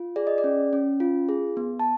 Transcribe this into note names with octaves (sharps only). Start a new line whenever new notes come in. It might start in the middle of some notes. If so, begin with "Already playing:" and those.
Already playing: F4
G#4 D5
D#5
D5
C#4
C#4
F4
G#4
B3
A5